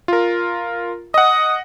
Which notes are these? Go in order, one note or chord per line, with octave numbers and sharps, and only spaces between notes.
F4 A#4
D#5 F#5 D#6